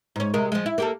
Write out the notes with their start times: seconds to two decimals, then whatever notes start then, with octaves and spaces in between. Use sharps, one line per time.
0.16 G#2 C#4
0.34 C3 G#3 A#4
0.52 F3 G#3
0.66 E4
0.78 A#3 G4 A4